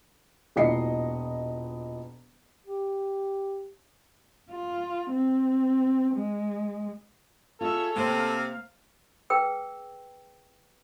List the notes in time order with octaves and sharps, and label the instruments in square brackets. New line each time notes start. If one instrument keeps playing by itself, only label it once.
[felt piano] E1 A#2 E3 D#5 C7 C#7
[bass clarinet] G4
[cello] F4
C4
G#3
[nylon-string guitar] F4 G#4 [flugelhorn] A4 [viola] C#5 E5
[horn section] C3 C4 [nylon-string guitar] A#3 C5 [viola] F5
[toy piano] G#4 B4 G5 E6